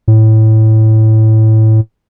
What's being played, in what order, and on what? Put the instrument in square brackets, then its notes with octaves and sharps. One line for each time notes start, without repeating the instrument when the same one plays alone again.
[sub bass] A2